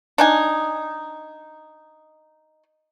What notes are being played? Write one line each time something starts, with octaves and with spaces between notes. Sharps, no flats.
D4 D#4 G#5